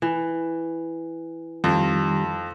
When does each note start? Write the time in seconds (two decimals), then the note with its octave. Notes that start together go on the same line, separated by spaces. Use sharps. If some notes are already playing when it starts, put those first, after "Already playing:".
0.02 E3
1.64 F2 D#3 G3